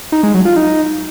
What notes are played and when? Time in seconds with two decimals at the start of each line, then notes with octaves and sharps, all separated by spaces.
0.12 D#4
0.23 G#3
0.34 F#3
0.45 F4
0.56 D#4